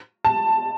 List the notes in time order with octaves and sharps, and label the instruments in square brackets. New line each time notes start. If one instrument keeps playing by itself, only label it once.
[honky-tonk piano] A5